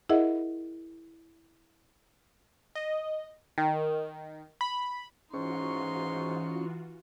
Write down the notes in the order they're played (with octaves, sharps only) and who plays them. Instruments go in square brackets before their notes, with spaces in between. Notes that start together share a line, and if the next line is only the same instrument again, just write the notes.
[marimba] E4 G#4 A#4 D#5 E5 F#5
[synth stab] D#5
D#3
B5
[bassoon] G#2 [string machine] E3 F4 F#4 [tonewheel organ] C#4 C#6 [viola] D#4 C6